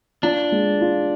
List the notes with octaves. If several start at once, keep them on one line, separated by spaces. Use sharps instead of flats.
D4 F4
G#3
F4